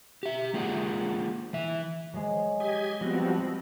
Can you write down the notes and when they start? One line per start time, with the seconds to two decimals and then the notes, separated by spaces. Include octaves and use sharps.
0.23 G4 E5
0.54 G#3 A#3 F4 G#4 D5 F#5
1.53 E3 E5
2.13 F#3 G#3
2.60 G4 D#5 G#6
3.01 F3 G3 B3 C4 F#4